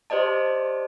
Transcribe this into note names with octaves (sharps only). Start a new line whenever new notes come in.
G4 C5 D5 D#5 A5